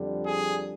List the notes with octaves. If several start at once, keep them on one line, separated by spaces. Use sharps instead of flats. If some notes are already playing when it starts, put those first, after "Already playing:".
Already playing: F2 D3 G3
G#4